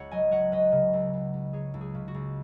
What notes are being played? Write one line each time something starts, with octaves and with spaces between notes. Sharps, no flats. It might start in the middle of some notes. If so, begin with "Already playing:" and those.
Already playing: C#2 C#5 F#5
F#3 D#5 G#5
F#3 C#5 F#5
F#3 B4 D#5
C#3
C#2
C#2
C#2
F#3 G#4 C#5
C#2
G#4
C#3
F#4
C#2